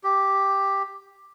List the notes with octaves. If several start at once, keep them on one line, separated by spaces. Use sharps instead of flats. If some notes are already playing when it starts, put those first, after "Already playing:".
G4